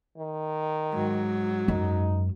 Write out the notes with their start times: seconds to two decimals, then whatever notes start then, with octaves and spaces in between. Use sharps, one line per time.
0.18 D#3
0.93 G#2 F#3
1.68 F#2 D#4